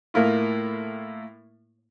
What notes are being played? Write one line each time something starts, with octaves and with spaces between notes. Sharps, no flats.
A2 A#3 E4 F4